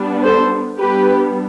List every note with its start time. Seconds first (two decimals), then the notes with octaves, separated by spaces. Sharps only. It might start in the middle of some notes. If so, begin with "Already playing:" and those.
Already playing: G3 B3 D4
0.23 A4 C5
0.78 G3 B3 D4 G4 B4